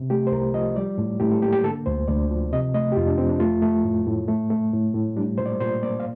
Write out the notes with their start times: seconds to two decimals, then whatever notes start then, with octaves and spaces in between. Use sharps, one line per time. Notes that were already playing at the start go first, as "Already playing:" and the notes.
Already playing: C3
0.10 A3 G4
0.27 C5
0.32 C2 A#4
0.54 F3 D#5
0.76 G3 D5
0.98 A2
1.20 A2 G4
1.31 A4
1.42 A#3 G4
1.53 G4
1.64 D3 A4
1.86 D2 C5
2.08 D2 D5
2.30 F3
2.52 C3 D#5
2.74 A3 D#5
2.92 G4
2.96 F2 F4
3.07 D4
3.18 F3 C4
3.29 D4
3.40 A3 F4
3.62 A3
3.84 A2
4.07 A2
4.28 A3
4.50 A3
4.73 A2
4.94 A2
5.17 G3 D4
5.38 A#2 C5
5.46 D5
5.60 A#2 C5
5.83 A#3 D5
6.00 F5